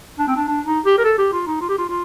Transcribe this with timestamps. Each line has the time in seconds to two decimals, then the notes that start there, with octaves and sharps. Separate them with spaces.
0.19 D4
0.27 C4
0.36 D4
0.48 D4
0.66 D#4
0.85 G4
0.98 A#4
1.04 A4
1.18 G4
1.33 F4
1.47 D#4
1.61 F4
1.69 G4
1.78 F4
1.89 F4